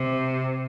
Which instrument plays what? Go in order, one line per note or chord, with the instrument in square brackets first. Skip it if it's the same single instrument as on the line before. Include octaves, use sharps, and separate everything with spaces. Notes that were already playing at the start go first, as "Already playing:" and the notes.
Already playing: [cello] C3